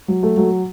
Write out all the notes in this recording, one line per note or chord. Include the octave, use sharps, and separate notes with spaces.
F#3
A3
F#3